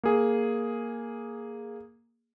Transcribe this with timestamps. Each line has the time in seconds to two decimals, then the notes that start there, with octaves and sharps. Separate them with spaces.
0.03 A#3 G#4